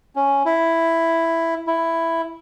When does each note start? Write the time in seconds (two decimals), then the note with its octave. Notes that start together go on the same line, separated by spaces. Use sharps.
0.16 C#4
0.46 E4
1.67 E4